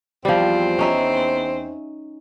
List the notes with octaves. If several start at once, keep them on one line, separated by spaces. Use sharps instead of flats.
E2 F3 G3 C4 C5
C#4 D#4 E5